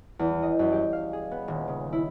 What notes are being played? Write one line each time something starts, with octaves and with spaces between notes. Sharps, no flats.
E2
D#5
F#2
G4
F5
G#4
B3
D#1
C#3
E4